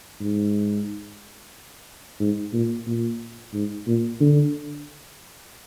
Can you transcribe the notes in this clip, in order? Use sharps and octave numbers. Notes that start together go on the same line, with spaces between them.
G#2
G#2
A#2
A#2
G#2
A#2
D3